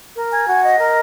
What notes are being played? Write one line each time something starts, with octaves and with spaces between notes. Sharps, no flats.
A#4
G#5
F#4
D#5
A#4